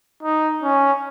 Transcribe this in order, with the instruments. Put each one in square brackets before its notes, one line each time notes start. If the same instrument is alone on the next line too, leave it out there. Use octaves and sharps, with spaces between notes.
[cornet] D#4
C#4